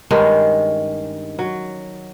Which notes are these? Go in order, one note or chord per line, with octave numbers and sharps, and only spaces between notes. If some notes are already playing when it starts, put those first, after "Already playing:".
G2 D#3 G#3 C#4
F#3